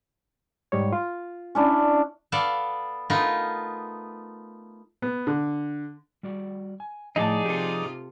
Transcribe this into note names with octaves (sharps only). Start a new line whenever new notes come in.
G#2 G3 C#5
F4
C#4 D4 E4
B3 A4 D5 F5
A3 B3 D#4 F4 A#4 B4
B3
D3
G3 F#4 D5
G#5
A2 F3 D#4 G#4 D5 D#5 F#5 A5
C3 F4 G4 A4